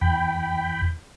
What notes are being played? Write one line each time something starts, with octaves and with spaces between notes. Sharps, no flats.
E2 G5 B5